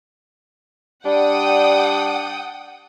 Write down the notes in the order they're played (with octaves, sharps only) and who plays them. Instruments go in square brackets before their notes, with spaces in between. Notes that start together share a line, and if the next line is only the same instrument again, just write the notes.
[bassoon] G3 [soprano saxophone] D4 [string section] F#5 G5 D#6